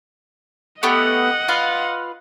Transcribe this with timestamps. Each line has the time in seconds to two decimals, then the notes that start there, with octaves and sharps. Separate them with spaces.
0.83 A3 B3 G4 D#5 F#5
1.48 F4 B4 F5